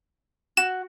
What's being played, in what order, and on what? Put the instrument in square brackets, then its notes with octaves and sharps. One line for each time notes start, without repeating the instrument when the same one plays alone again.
[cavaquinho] F#4 [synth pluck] E7